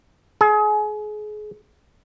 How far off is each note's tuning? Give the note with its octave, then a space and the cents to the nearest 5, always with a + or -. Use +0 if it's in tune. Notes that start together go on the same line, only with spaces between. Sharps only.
G#4 +30